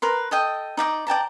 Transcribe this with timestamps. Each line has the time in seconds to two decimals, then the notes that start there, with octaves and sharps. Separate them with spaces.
0.02 A#4 B4 C6
0.31 A4 D#5 G5
0.77 D#4 D5 G5 D6
1.07 D5 G5 A5 A#5